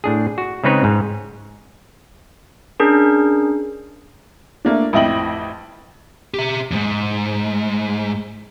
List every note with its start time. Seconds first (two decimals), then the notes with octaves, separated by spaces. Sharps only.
0.04 A2 D4 G#4
0.38 F#4
0.64 C#3 G#3 C4 D#4 B4 C#5
0.84 G#2
2.80 C#4 D4 G#4 A#4
4.65 A3 A#3 D4
4.93 A1 F2 E4 D#5 G5 F#7
6.34 G4 E5
6.71 E2 G#2